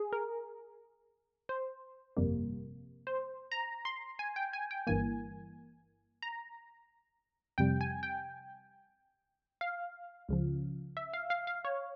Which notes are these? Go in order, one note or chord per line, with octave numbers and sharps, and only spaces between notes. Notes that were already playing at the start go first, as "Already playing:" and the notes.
Already playing: G#4
A#4
C5
G1 F2 C3 G3 A#3
C5
A#5
C6
G#5
G5
G#5
G5
G1 G2 E3 A#3 G#5
A#5
F2 C3 G3 G5
G#5
G5
F5
C#2 C#3 F3
E5
F5
F5
F5
C#5